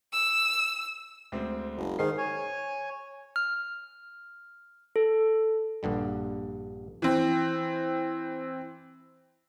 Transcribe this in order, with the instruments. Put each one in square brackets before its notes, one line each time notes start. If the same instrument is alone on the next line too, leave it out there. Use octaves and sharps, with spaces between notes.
[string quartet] E6
[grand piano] D2 G#3 C4
[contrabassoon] F#1
[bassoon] G#2 [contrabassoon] D#3 [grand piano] G#5 C7
[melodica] C#5 G#5
[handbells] F6
A4
[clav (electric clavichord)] A#1 G2 D3 G3
[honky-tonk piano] E3 C4